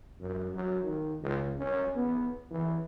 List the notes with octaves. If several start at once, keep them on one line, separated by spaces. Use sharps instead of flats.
F#2
F#3
D#3
C#2
C#4
B3
E3